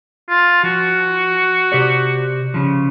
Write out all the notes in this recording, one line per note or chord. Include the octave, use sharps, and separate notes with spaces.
F4
F3 F#4
C3 G4 D5
C#3 F3